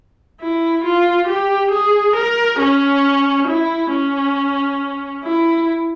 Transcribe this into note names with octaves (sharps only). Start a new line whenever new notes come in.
E4
F4
G4
G#4
A#4
C#4
E4
C#4
E4